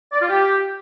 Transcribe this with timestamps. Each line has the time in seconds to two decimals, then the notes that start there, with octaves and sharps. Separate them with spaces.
0.12 D5
0.20 F4
0.28 G4